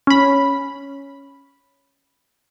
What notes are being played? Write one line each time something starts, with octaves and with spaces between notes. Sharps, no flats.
C#4 B5